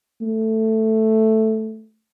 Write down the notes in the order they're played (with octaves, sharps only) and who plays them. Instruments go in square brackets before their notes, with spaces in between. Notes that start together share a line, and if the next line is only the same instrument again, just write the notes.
[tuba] A3